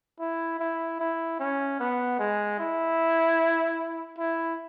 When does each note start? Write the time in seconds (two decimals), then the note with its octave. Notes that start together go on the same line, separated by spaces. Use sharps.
0.20 E4
0.60 E4
1.00 E4
1.40 C#4
1.80 B3
2.19 G#3
2.59 E4
4.19 E4